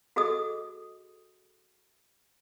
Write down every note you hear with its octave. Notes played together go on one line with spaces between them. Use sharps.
F#4 G#4 A4 D#5 D#6